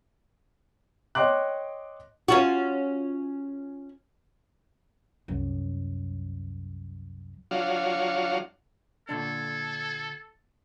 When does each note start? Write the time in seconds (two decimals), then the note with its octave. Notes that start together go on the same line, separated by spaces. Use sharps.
1.15 C#5 D#5 G5 C6 D6 F#6
2.28 C#4 F4 F#4
5.28 C2 F#2
7.51 F#3 D4 F4 F#4 C#5 F5
9.09 A#2 D3 D4 A4 G#6